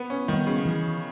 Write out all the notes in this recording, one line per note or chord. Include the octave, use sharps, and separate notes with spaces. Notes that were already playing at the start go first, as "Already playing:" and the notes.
Already playing: B3
C#4
D#3 G3 B3
C#3
E3